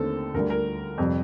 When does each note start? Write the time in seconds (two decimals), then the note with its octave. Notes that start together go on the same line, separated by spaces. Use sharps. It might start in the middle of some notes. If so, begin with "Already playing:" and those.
Already playing: D#2 D3 A3 C4 A4
0.34 D2 D3 G3 A#4
0.50 A#4
0.98 F2 C3 G3